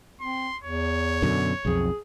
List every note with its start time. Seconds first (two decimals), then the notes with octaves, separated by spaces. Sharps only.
0.21 C4 C6
0.64 E2 C#5
1.22 F#2 B2 D3
1.65 B1 F2 G#4